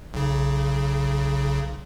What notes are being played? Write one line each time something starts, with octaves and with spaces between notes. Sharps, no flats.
B1 C#3